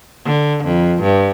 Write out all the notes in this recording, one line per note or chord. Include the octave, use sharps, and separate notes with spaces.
D3
F2
G2